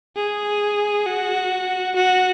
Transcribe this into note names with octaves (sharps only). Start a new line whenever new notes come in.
G#4
F#4
F#4